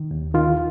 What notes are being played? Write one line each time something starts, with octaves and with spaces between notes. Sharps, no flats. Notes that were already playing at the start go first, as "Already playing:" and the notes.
Already playing: D#3
D#2
D#3 F4